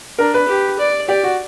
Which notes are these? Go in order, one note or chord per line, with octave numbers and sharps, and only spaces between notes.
D4 A#4
B4
G4
D5
G4 D5
F#4